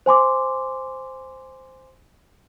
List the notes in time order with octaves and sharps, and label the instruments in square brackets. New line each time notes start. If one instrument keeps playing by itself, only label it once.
[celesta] C5 G#5 C6 D6